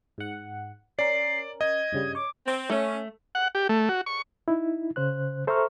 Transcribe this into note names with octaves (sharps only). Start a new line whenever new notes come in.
G#2 F#5
C#4 A#4 D5 C7
D#5 G#6
G2 C#3 G3
C#5 D6
C4
A3 C#4
F#5
G4
A3
F#4
C#6
D#4 E4
C#3 C5 F#6
A4 C5 E5 A#5 C#6 F6